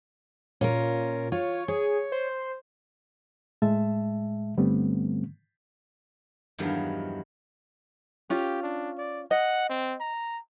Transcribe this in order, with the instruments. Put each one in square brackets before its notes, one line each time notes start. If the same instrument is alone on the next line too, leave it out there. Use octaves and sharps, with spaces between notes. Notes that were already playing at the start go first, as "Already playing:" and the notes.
[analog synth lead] A#2 [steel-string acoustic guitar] C#4 F4 A#4
[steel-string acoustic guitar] F4 [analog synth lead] C#5
[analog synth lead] G#4 [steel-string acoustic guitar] C#5
[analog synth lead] C5
[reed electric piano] A2 G#3 E5 A5
G2 D3 G3 A3 B3 C4
[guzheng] E2 G2 D#3 F3 F#3
[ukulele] C#4 F4 [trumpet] G4
[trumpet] D4
D5
[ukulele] D#5 [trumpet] F#5
[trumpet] C4
A#5